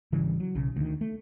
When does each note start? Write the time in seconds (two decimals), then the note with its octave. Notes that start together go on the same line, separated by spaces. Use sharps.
0.12 G#1 C#3 E3 G3
0.40 F#3
0.55 B1 C#3
0.76 D2 D#3
1.01 A3